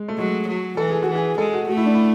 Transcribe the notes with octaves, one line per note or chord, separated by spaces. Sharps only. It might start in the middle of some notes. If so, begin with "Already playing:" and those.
Already playing: G#3
A3
F#3 G#3
F#3
E3 A4
G#4
F#4
E3
G#4
G#3 A4
F#4
A3 F#4
E4
D4
E4